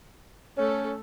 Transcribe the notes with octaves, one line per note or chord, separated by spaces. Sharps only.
A3 C#4 A4 C#5